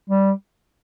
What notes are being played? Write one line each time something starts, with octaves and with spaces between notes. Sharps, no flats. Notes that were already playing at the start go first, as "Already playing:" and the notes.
G3